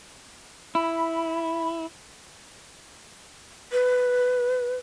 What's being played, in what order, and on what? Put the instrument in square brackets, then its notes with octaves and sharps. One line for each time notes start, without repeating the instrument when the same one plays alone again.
[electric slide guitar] E4 [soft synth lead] B5
[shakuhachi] B4